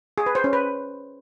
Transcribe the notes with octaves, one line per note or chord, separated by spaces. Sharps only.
G#4
B4
C5
C#4
B4